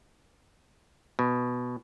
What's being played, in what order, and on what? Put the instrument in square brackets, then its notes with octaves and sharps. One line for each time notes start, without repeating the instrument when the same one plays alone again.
[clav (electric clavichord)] B2